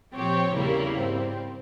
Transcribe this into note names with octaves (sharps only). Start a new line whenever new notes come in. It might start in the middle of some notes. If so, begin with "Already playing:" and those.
A#2 F3 C4 G4 C#5
E2 C#3 G3 A#3 E4
G#2 G3 C4